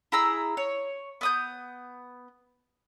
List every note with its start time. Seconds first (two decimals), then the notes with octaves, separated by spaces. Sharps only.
0.12 E4 G#4 A#5 E6
0.57 C#5
1.21 B3 D#6 G6